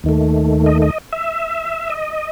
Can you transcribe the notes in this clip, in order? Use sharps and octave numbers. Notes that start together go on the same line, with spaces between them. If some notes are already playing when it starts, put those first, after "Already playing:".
D#2 D#3 A3
D#5
D#5
E5
D#5